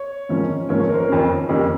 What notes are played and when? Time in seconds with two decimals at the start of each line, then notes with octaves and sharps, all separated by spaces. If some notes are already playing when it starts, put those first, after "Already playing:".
Already playing: C#5
0.29 G#2 F3 A#3 C#4
0.69 G#2 F3 A#3 C#4 C#5
0.80 C#5
0.89 A#4
0.94 C5
0.99 A#4
1.09 F2 D#3 A#3 C#4
1.49 F2 D#3 A#3 C#4 G4